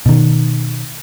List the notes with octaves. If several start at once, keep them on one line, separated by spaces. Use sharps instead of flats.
B2 D#3